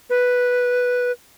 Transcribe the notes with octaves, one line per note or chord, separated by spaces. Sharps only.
B4